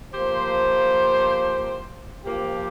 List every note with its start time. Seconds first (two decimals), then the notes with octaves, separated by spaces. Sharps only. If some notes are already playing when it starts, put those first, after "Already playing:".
0.13 F3 A#3 G4 C5
2.26 F3 A#3 G4